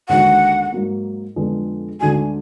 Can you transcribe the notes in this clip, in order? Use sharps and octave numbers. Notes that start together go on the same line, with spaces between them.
D#2 D3 G#3 D#4 F#4 F#5
G#2 F#3 A#3
F2 D3 F3 G#3 B3
D2 D3 G#3 D#4 F#4 G#5